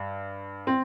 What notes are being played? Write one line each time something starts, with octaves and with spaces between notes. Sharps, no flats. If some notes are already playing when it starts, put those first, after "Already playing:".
Already playing: G2
C4